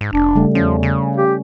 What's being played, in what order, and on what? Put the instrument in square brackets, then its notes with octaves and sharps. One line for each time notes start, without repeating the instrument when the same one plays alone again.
[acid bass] G#2
[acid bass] F1 [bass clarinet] D4
[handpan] C#3 G3 A3
[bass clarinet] E2 [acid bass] F3 [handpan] C#4
[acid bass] C#3
[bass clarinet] G4